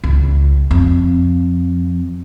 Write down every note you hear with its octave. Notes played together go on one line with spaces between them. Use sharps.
C#2
F2